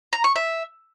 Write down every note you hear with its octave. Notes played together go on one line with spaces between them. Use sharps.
A#5
C#6
E5